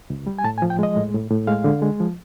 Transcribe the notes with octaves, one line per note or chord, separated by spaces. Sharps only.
C#2
G3
G#5
A2 A5
G#5
F3
G5
G#3 D#5
A2
A2
A2
G#3 F5
D3
G#3
F3